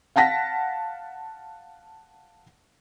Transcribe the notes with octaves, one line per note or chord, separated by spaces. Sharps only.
F5 F#5 A5 A#6 B6